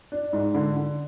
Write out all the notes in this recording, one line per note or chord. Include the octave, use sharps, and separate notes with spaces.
D4
G#2
D3
D3